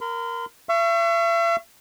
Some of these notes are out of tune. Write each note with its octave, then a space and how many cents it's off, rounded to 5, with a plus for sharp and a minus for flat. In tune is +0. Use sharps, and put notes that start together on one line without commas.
A#4 +0 C6 -45
E5 +45 C#6 +0